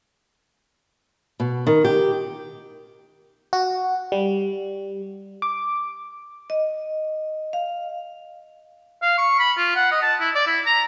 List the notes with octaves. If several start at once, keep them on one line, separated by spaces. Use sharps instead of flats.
B2
D#3
G4
F#4
G3
D6
D#5
F5
F5
C#6
B5
F4
F#5
D#5
A5
E4
D5
E4
A#5